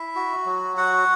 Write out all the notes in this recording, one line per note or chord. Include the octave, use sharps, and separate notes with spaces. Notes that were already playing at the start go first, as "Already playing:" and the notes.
Already playing: E4 E5
F#4
F#3
F#4 F#5